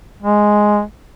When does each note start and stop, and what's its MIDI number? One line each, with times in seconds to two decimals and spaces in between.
0.22 0.81 56